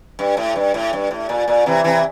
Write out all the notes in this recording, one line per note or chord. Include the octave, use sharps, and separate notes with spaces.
G2
A2
G2
A2
G2
A2
A#2
A#2
C3 E3
C3 E3